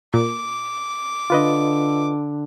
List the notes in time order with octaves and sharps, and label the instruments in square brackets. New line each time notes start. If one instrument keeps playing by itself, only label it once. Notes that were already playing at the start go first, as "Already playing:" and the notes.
[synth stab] A#2 [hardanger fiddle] D6
[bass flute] D3 [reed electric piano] F4 B4 D#5